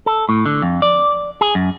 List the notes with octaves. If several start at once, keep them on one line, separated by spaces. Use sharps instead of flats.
A4
A2
D3
F2
D5
G#4
F#2